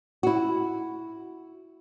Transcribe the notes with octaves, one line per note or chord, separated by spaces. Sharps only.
E4 F#4